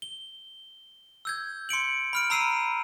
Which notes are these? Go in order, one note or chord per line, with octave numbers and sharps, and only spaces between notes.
G7
E6 G6 G#6
C6 C#7 D7 F#7
B5 F6 D7
A#5 B5 E6 C7 D#7